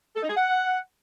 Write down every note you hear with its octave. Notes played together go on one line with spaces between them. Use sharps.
A4
D#4
G#4
F#5